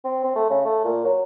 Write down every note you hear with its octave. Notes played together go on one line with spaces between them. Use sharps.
C4
C4
A3
C#3
A3
A#2
F#3